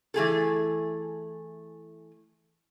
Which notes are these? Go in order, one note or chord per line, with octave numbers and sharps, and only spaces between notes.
E3 A3 G#4 A4